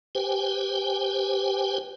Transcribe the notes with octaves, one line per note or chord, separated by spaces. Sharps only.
G4 B4 C5 G5 G#5